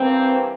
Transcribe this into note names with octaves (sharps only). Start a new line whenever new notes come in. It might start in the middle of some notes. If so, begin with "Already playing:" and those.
Already playing: G2 E3 A#3 C4